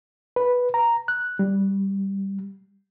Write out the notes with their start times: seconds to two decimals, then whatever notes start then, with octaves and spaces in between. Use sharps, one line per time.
0.36 B4
0.74 A#5
1.08 F#6
1.39 G3